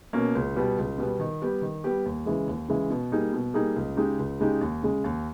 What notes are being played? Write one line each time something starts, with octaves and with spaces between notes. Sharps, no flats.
B2 A#3 C#4
C#2
B2 G3 B3
C#2
B2 G3 B3
D#3
G3 B3 G4
D#3
G3 B3 G4
D#2
C#3 E3 G#3
D#2
C#3 E3 G#3
B2
G3 A#3 D#4 G#4
B2
G3 A#3 D#4 G#4
C#2
C#3 G#3 D#4 G4
C#2
C#3 G#3 D#4 G4
D#2
C#3 G#3
D#2